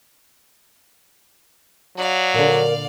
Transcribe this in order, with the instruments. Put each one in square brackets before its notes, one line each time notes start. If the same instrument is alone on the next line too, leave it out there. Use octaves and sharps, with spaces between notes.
[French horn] F#3 [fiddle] D5 F5
[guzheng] A#2 D3 [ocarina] A#4